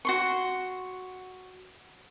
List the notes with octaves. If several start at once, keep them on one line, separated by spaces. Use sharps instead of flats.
F#4 C6 C#6